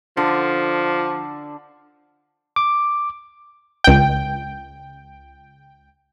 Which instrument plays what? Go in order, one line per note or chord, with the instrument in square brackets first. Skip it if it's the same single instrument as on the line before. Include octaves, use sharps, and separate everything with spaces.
[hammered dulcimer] D3 [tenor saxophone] F3
[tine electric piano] D6
[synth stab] C#2 G5